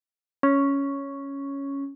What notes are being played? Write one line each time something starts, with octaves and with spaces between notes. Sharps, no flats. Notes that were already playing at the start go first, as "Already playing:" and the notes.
C#4